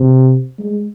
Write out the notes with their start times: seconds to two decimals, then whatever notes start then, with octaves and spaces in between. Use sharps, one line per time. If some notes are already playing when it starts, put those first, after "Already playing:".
Already playing: C3
0.59 G#3